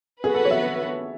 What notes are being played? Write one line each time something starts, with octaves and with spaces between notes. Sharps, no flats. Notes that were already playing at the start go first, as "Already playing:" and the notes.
B3 F#4 G#4 B4
A4
C#5
E5